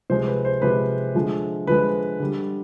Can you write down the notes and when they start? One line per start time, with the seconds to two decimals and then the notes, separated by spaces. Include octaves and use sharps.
0.10 C3 F3 G#3 C5
0.27 B4
0.45 C5
0.62 C3 F3 G#3 B4
1.15 D3 F3 G#3
1.67 D3 F3 G#3 B4
2.20 D3 G3